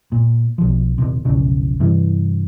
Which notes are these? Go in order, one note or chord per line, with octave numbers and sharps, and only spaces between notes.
A#2
B1 F3
D#1 G#1 C3
F1 B1 C#3
G2 C3 E3